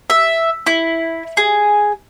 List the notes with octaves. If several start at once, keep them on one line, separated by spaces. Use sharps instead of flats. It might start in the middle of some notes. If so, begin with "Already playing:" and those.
E5
E4
G#4